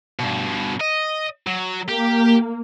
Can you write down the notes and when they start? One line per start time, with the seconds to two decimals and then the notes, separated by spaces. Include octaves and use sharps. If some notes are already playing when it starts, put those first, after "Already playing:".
0.19 G2 B2
0.81 D#5
1.47 F#3
1.89 A#3 G4